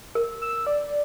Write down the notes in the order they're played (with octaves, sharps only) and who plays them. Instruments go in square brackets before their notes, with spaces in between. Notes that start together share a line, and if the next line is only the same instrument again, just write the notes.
[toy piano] A#4
[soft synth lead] E6
D5